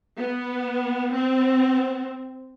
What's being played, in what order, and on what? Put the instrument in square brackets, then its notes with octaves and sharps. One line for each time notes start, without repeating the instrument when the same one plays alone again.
[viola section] B3
C4